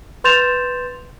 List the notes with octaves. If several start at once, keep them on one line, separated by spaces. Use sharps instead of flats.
B4 C6 G6 A6 E7 F7